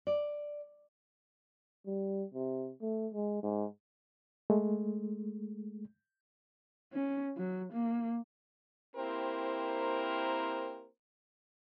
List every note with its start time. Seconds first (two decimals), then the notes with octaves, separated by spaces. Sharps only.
0.07 D5
1.86 G3
2.34 C3
2.81 A3
3.13 G#3
3.43 G#2
4.50 G#3 A3
6.93 C#4
7.37 F#3
7.73 A#3
8.96 A#3 C4 E4 G4 A#4 C5